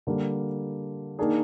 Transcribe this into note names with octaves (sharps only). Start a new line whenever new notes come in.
D3 G3 A#3
D#3 A#3 D4 G#4